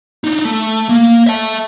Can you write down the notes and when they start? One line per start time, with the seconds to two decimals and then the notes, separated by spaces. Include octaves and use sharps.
0.24 D4 D#4
0.45 A3
0.89 A#3
1.27 E5 A5